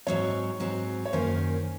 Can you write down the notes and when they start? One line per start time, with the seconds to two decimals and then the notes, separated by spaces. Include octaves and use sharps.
0.07 G#2 F#3 C4 C#5
0.60 G#2 F#3 C4
1.06 C#5
1.13 F#2 D#3 A#3 C#4 C5